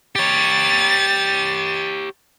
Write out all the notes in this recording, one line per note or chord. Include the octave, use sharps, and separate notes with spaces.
G4 C#5 A6